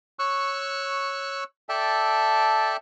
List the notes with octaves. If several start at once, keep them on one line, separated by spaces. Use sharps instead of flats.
C#5 C#6 E6 F#6
A4 D5 E5 G5 A5